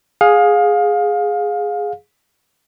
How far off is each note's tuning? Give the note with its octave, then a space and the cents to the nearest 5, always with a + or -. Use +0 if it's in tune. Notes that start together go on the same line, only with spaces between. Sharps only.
G#4 +0 F5 +25